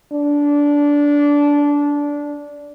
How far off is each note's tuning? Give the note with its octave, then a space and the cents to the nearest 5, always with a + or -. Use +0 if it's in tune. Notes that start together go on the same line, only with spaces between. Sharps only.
D4 -15